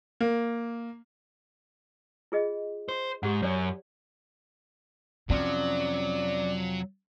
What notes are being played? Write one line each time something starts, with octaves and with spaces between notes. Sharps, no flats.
A#3
F4 G#4 D#5
C5
G#2 G4 F#5
F#2 C#5 D5
F2 C3 F3 F#3 C#4 D5